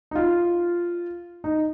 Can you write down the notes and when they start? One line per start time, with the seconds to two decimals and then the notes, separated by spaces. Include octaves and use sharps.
0.11 D#4
0.15 F4
1.44 D#4